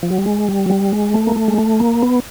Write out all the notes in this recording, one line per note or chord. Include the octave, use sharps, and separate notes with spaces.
F3
F#3
G3
G#3
G3
F#3
G3
G#3
A3
A#3
A3
G#3
A3
A#3
B3